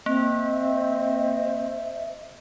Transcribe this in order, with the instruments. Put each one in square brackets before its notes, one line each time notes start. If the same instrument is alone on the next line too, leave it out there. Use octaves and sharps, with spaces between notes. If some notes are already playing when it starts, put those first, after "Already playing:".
[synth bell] A#3 [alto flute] C4 [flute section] C5 D#5 E5